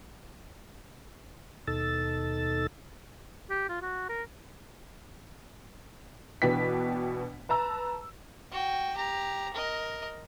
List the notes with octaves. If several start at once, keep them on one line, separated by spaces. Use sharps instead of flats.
D#2 B2 D#4 A4 E6 A6
G4
F4
F#4
A#4
B2 E3 D4 B4 G5 B6
B4 A5 A#5 E6
F#4 G5
G4 A#5
A#4 D#5